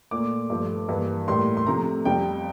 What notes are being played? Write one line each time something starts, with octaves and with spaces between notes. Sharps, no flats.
A#2 A3 D6
G2 F3 A3
G2 E3 A#3
A2 G3 A#3 C6
C6
C3 F3 A3 A#5
F2 C3 G3 G5